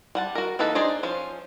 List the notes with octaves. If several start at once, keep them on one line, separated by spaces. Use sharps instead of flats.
G3 F#5 A5
F#4 A#4
E3 A#3 D#4 A4 B4
D4 D#4 G#4 C5 D5
F3 C#4 C5